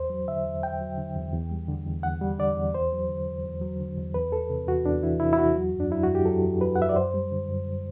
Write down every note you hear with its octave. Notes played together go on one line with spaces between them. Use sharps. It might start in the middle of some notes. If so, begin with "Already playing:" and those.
Already playing: E2 C5
F#3
D3 E5
E2
E2 G5
F#3
D3
E2
E2
G3
D3
E2
E2 F#5
G3
D3 D5
E2
E2 C5
F#3
D3
E2
E2
F#3
D3
E2
E2 B4
E3 A4
C3
E2 F#4
E2 D4
E3 E4
C3 E4
E4
E2 F#4
F#3
F#2
D4
F#3 E4
F#2 F#4
G4
F#3 A4
F#2
F#3 B4
F#5
F#2 E5
D5
F#2 C5
G3
D3
F#2